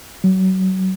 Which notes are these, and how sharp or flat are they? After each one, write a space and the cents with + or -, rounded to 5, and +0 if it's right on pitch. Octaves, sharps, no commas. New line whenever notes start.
F#3 +30